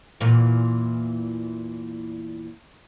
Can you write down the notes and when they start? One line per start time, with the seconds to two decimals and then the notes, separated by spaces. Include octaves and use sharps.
0.20 E2 A#2 E3